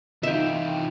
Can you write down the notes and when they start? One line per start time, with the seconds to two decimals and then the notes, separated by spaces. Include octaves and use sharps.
0.23 C3 E3 D#4 F4 E5 G5